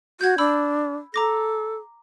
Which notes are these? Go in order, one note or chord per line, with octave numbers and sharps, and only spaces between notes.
F#4 G6 G#6
D4 B5 E6
A4 A#5 D6 A#6